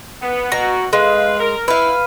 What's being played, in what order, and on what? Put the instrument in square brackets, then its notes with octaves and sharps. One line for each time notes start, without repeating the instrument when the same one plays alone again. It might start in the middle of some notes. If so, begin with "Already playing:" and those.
[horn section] B3
[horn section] B2 F#4 [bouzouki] A#5
[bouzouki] G#3 [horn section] B4 F5
[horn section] A#4
[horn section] E4 [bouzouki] B4 F5